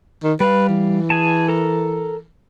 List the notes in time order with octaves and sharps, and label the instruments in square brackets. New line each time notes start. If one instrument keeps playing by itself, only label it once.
[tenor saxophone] D#3
[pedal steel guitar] G3 F5 [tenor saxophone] B4
[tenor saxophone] E3
[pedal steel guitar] G#4 G#5 A5
A4 A#4 A#5